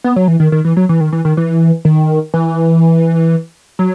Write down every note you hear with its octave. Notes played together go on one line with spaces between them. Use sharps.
B3
F#3
E3
D#3
D#3
E3
F#3
E3
D#3
E3
D#3
E3
D#3
E3
F#3